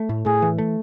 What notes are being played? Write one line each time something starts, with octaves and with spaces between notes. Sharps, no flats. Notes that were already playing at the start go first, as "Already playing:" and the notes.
Already playing: A3
A2
A2 G#4
E3
A3